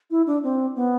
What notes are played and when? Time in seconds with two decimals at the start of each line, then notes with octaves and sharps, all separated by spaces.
0.11 E4
0.27 D4
0.43 C4
0.76 B3